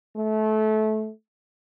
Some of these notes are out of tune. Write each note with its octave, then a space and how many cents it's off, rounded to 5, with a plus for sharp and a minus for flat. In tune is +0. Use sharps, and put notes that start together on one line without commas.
A3 -25